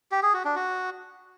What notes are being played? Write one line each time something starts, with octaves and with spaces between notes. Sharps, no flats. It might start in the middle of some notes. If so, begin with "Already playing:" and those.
G4
G#4
F#4
D4
F#4